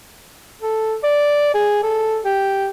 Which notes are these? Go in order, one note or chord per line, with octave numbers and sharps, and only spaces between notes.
A4
D5
G#4
A4
G4